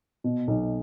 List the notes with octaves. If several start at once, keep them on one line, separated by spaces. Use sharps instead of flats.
B2
B1